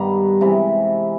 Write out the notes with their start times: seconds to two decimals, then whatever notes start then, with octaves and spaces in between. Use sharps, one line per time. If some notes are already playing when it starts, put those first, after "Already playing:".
Already playing: G2 D#3 G3 B3 A#5
0.41 C3 E3 G#3